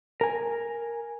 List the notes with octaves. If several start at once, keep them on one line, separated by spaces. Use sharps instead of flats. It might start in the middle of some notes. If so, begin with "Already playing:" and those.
A#4 G#5